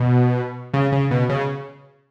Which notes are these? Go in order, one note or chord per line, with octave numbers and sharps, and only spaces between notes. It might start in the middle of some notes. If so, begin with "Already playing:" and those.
Already playing: B2
C#3
C#3
B2
C#3